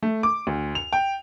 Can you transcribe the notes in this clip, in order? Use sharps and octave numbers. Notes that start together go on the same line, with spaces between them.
A3
D6
D2
F7
G5